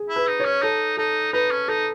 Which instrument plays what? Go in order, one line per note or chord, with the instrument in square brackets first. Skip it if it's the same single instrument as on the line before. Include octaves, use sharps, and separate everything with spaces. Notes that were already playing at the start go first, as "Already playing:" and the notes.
Already playing: [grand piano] G#4
[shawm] E4
[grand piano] B4
[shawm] D#4
[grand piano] C#5
[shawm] C#4
[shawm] D#4 [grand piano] A4
[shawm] D#4 [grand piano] A4
[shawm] D#4 [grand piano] B4
[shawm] C#4
[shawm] D#4 [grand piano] A4